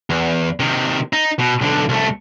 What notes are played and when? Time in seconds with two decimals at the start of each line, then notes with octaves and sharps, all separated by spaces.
0.10 E2
0.60 C3 D#3
1.13 D#4
1.39 B2
1.61 B1 D3
1.89 C2 A3